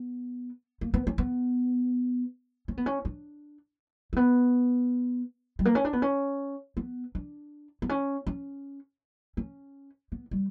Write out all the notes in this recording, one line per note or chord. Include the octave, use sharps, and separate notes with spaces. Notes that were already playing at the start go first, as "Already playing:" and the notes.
Already playing: B3
A#3
B3
C#4
B3
C#4
B3
C#4
D4
A#3
B3
G3
A#3
C#4
D4
B3
C#4
B3
D4
B3
C#4
C#4
C#4
B3
G3